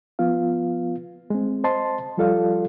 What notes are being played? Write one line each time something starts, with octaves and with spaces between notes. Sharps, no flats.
F3 B3 F4 F5
G#3 C4
C5 D#5 A5 C6
F3 G3 F4 A4 D5 F5